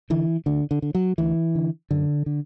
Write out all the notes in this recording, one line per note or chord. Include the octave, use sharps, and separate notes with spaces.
D3 E3
D2 D3
D3
D3
F#3
D2 E3
D3
F#2 D3
D3